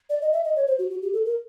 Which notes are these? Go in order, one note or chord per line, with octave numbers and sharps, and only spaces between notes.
D5
D#5
E5
D#5
C#5
C5
F#4
F#4
G4
A4
A#4